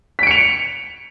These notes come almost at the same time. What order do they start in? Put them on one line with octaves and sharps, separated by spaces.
B6 D7 C#7 F7